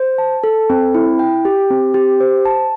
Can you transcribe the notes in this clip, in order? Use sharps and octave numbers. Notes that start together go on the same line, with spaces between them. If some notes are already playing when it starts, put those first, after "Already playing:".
Already playing: C5
A5
A4
C4
E4
G5
G4
C4
G4
C5
A5